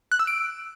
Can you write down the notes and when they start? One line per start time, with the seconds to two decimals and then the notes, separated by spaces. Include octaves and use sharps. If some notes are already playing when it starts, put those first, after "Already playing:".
0.12 F#6
0.19 E6
0.27 D7